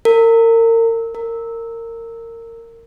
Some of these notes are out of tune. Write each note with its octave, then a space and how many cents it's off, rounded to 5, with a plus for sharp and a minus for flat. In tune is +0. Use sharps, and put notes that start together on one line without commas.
A#4 -35
A#4 -25